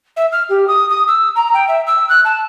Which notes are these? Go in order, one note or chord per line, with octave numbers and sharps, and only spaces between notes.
E5
F6
G4
D#6
D#6
E6
A#5
G5
E5
E6
F#6
A5